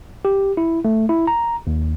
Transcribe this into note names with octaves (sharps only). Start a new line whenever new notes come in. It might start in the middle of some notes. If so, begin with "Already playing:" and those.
G4
E4
A3
E4
A#5
D#2